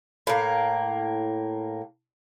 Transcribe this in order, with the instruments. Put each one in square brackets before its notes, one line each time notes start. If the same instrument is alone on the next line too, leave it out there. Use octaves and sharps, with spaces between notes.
[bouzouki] A2 A#3